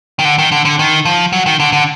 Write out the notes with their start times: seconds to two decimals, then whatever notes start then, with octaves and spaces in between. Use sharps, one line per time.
0.19 D#3
0.25 D3
0.38 D#3
0.52 D3
0.65 D3
0.79 D#3
1.05 F3
1.33 F#3
1.46 D#3
1.60 D3
1.73 D3